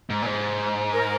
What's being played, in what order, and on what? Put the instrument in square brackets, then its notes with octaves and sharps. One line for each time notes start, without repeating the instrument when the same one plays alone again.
[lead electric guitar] G#2
A#2
G#2
[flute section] A#4